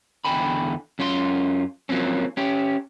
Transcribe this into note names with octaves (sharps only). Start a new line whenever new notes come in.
E2 D3 G5 G#5 B5
F#2 C#4 F4 G#4 C6
F3 F#3 A#3 C4 C#4
C#4 G4